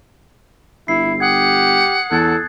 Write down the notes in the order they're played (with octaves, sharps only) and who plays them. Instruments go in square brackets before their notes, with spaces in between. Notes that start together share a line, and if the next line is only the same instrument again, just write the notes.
[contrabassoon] G1 [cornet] E4 [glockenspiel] C7
[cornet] G4 [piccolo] F#5 [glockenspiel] D#6 G#6
[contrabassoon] E2 [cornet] A4 [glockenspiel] F#6 G#6 A6